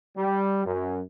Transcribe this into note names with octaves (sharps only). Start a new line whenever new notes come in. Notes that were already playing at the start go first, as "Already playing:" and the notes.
G3
F#2